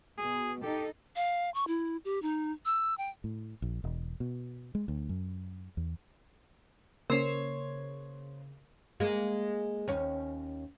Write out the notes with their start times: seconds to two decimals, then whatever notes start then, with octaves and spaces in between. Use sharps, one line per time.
0.18 B2 G#4
0.62 D#4 G4 A4
1.16 F5
1.54 C#6
1.68 E4
2.05 G4
2.22 D#4
2.65 E6
2.98 G5
3.24 A2
3.62 A#1
3.84 E1
4.20 B2
4.75 G#3
4.88 D2
5.09 F#2
5.77 E2
7.10 C#3 A#3 C#4 A#4 C5 C#5
9.00 G#3 A#3
9.88 D#2 C#4